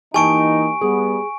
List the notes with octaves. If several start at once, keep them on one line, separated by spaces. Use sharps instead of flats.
E3 A#3 D#4 G4 G#5 A5 C#6 D7
G3 B3 G#4